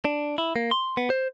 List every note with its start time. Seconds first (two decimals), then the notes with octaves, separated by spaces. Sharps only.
0.05 D4
0.38 E4
0.56 A#3
0.71 C6
0.97 B3
1.10 C5